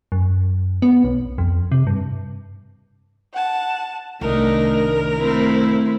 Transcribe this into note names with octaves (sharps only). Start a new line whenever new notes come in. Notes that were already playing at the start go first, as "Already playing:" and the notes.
F#2
B3
B1
F2
C3
G2
F#5 A5
C2 D#3 A3 D4 D#4 A#4
A2 A3
A3 C4 E4